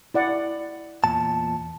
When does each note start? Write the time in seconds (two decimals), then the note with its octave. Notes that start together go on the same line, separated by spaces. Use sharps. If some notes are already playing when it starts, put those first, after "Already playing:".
0.14 E4 D5 F#5
1.04 E2 A#2 A5